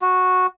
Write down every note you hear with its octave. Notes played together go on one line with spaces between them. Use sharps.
F#4